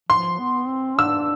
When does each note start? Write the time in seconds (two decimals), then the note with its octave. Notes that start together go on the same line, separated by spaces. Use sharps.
0.09 F3 C6
0.39 B3
0.68 C4
0.99 D4 E6